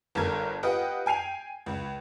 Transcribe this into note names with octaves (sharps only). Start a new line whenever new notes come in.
G1 G2 A4 A#4 G#6
F4 G4 B4 D#5 F#5 G5
G5 G#5 C7 F7
C#2